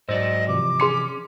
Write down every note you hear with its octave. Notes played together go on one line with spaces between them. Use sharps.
G#2 F#3 C5 D5 D#5 E6 A#6
C3 E3 F3 D6
C#4 G#4 C6 C#7